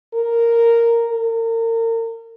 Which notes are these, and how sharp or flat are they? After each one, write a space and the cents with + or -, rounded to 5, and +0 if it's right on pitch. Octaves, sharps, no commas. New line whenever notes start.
A#4 -5
A#4 -35